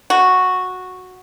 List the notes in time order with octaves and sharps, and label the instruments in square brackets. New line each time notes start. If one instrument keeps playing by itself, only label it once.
[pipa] F#4